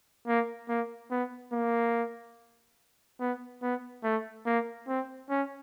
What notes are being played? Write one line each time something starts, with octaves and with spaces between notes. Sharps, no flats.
A#3
A#3
B3
A#3
B3
B3
A3
A#3
C4
C#4